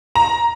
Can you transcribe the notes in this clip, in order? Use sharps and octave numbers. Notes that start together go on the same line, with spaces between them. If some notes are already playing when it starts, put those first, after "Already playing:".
A#5